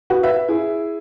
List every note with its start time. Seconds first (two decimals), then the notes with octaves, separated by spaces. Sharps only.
0.10 F#4 B4
0.23 B4 E5
0.48 E4 G#4